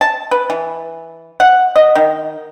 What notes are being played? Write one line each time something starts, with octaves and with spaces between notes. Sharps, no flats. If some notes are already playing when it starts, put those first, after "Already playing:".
A5
B4
E3
F#5
D#5
D#3